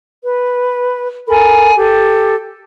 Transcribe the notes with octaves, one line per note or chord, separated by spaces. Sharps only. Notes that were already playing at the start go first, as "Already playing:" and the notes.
B4
A4 A#4 G#5 B5
G4 A4